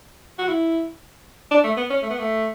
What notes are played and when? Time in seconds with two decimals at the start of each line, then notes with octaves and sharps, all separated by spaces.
0.39 F#4
0.48 E4
1.51 D4
1.64 A3
1.77 B3
1.90 C#4
2.02 A3
2.10 B3
2.18 A3